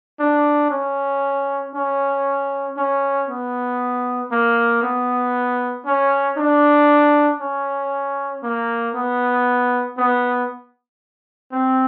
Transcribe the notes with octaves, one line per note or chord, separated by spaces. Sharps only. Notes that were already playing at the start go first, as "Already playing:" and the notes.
D4
C#4
C#4
C#4
B3
A#3
B3
C#4
D4
C#4
A#3
B3
B3
C4